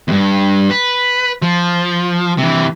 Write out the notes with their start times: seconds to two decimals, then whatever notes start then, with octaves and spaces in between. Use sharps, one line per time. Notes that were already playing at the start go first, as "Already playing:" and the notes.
0.08 E2 G2
0.71 B4
1.42 F3
2.38 C3 E3